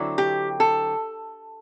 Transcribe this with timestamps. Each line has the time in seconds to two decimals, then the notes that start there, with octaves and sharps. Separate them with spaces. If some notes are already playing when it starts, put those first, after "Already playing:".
Already playing: D3 F#3 C4 E4
0.18 G4
0.60 A4